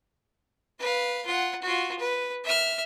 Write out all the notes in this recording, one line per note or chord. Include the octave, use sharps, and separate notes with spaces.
B4 F5
F4 F#5
F4 F#4
B4
E5 F6